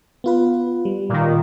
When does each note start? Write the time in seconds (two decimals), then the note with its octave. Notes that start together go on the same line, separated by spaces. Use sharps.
0.24 B3 F4 B4
0.85 G3
1.09 A#2 D#3